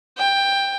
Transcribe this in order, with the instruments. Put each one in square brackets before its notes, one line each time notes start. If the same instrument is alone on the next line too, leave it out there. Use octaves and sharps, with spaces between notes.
[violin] G5